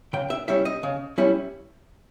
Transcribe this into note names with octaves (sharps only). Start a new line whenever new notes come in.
C#3 G5
E5
G3 C#4 E4 E5
D#5
C#3
G3 C#4 E4